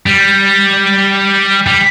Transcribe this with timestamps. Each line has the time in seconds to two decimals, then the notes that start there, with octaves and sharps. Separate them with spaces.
0.06 G3
1.67 G3